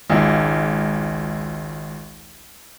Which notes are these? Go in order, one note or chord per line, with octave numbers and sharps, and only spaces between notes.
G#1 C#2